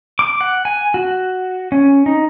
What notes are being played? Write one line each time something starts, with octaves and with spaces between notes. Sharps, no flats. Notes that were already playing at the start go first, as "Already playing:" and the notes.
D6
F#5
G#5
F#4
C#4
D#4